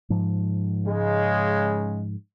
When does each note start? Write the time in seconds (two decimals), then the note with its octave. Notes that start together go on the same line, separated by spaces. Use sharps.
0.10 G#2 F3
0.85 C#3 G#3